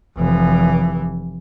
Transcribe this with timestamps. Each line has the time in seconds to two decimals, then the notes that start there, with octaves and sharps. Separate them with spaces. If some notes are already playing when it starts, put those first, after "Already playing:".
0.17 F1 E3